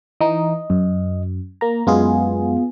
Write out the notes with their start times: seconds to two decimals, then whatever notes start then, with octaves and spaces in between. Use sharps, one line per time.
0.21 E3 D#4 D#5
0.70 F#2
1.61 A#3 A#5
1.87 F#2 G#3 B3 F4 G#4